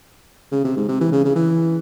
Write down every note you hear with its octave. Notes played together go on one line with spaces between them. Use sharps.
C#3
C3
G#2
C3
E3
C#3
C#3
E3